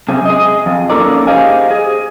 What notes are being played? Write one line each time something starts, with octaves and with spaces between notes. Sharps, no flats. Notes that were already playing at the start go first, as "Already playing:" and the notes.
F#2 C3 C4 G#4
G#4 D#5
F2
A#3 C#4 D#4 A4 A#4 D5
G4 G#4 C5 D#5 F5 G#5
G#4